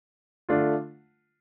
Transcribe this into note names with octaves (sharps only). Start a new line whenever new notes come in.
D3 A3 D4 F4